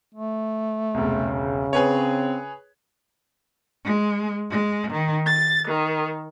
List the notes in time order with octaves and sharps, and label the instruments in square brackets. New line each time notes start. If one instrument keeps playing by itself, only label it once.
[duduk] A3
[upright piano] E1 C2 [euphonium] C#3
[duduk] C4 [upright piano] G#4 B4 C#5
[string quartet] G#3
G#3
D#3
A6
D#3